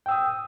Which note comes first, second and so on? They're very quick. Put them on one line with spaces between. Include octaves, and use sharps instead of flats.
G5 E6 D#6